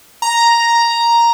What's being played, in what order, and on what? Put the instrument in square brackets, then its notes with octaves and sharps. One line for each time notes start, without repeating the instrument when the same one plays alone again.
[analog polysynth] A#5